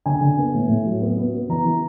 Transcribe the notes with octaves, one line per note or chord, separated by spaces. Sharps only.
D3 G#5
D3
B3
A2
A2
F#3
B3
B3
B3
E3 A#5
E3